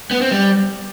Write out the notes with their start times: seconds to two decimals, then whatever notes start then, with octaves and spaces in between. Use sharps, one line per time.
0.11 B3
0.21 C4
0.31 G3